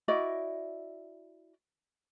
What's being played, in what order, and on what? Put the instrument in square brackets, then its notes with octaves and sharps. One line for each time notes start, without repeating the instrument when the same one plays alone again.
[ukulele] E4 F#4 D5 D#5